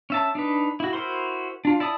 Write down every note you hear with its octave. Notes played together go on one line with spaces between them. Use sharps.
C#4 E5 A5
D4 D#4 B4
E4 F#4
E4 F#4 A#4 C5 C6
D4 F4
E4 D5 A5 D#6